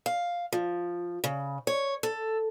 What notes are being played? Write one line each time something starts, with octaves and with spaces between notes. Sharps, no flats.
F5
F3
C#3
C#5
A4